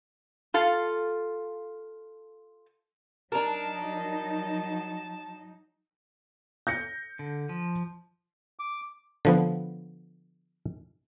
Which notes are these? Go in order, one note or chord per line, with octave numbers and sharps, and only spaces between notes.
F4 A4 F5
F#3 D4 D#4 A#4 A5
G6 A#6 C#7
D3
F3
D6
D3 F3 B3